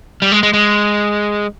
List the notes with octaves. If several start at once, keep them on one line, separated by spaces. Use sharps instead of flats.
G3
G#3
G#3
G#3